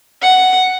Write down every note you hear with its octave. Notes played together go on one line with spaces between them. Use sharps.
F#5